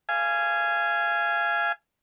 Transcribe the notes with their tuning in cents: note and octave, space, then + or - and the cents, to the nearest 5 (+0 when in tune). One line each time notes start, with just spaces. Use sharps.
F5 -25 G#5 +0